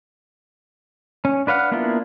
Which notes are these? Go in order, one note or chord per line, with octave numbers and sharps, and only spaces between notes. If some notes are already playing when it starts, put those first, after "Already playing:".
C#4
D4 B4 F5 F#5
A#3 B3 D4 E4 F4